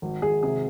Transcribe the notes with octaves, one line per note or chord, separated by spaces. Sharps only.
G#1
G#1 G#4
C3 G#4